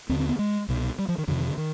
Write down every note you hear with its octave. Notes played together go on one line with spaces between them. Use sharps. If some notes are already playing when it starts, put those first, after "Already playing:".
D#2 D3 C4
C4
B3
G#3
C2 B2
G3
F3
D#3
F2 C3 D3
D#3
D3
D#3